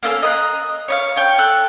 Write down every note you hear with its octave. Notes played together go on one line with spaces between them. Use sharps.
A#3 C#4 A4 F5
D#5 A#5 F#6
C#5 D#5 F5
C#5 G5
A4 F#6